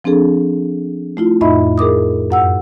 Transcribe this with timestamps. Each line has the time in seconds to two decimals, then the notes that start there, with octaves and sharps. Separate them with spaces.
0.04 F3 C4 D4 G#4 A4
1.17 A3 E4 F4
1.41 F2 A2 D#4 D#5 E5 B5
1.78 G#4 A#4 D6 D#6
2.30 F#2 F#5 E6